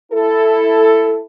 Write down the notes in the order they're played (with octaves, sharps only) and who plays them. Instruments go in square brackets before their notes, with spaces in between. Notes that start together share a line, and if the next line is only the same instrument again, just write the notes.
[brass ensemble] E4 A4